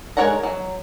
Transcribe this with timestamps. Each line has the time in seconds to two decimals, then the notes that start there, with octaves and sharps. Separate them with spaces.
0.17 G#3 A#4 C#5 F#5 A#5
0.43 F#3